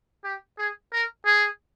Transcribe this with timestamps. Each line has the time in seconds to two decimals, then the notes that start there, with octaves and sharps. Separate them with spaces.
0.24 G4
0.58 G#4
0.93 A#4
1.26 G#4